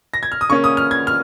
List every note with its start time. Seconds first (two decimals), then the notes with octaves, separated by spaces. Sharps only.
0.14 A#6
0.23 G#6
0.32 F6
0.41 D#6
0.50 C#3 A#3 C#4 C#6
0.64 D#6
0.77 F6
0.91 G#6
1.07 F6